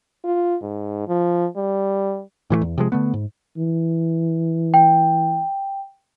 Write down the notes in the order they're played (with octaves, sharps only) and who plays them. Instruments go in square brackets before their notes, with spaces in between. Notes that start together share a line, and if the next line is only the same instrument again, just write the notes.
[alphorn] F4
G#2
F3
G3
[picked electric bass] A2 E3 F3 A3
E2
C3 F3 G#3
D3 A3 B3
G#2
[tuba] E3
[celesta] G5